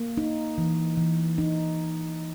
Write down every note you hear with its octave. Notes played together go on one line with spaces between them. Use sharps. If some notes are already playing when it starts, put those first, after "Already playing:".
Already playing: A#3
D#4
E3
E3
D#4